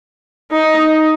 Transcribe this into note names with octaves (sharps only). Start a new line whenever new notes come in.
D#4